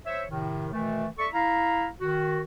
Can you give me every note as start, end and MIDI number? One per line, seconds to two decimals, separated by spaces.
0.06 0.23 72
0.06 0.23 73
0.06 0.23 76
0.29 0.68 45
0.29 0.68 48
0.29 0.68 51
0.72 1.06 47
0.72 1.06 51
0.72 1.06 52
0.72 1.06 57
1.18 1.28 69
1.18 1.28 74
1.18 1.28 76
1.18 1.28 85
1.33 1.87 64
1.33 1.87 77
1.33 1.87 82
2.01 2.40 51
2.01 2.40 66